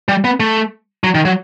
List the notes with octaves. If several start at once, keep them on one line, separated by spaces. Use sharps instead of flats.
G3
B3
A3
F#3
D#3
F#3